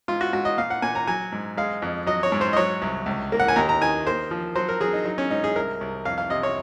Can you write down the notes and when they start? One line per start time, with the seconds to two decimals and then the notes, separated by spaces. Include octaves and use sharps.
0.08 G#2 F4
0.21 F#4
0.33 G#2 F#4
0.45 D#5
0.58 A#2 F5
0.70 F#5
0.82 A#2 G#5
0.95 A#5
1.07 F#3 G#5
1.32 G#2
1.57 G#3 F5
1.82 F2
2.07 F#3 D#5
2.23 C#5
2.32 G#2
2.41 C5
2.53 D#5
2.57 F#3 C#5
2.82 C2
3.06 C#2
3.32 A#3
3.40 F#5
3.48 G#5
3.56 D#2 A#5
3.69 A#5
3.81 D#3 G#5
4.07 A#3 C5
4.31 F3
4.55 F#3 C5
4.69 A#4
4.81 F#3 G#4
4.93 D#4
5.05 F#3 D#4
5.18 C#4
5.30 G#2 D#4
5.44 G#4
5.55 C2 A#4
5.81 C2
6.05 F2 F5
6.18 F5
6.30 C3 D#5
6.43 C#5